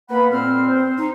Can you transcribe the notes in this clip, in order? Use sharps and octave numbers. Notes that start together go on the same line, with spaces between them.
A#3 B3 F#5 B5
F2 A#2 C4 F6
C5
D#4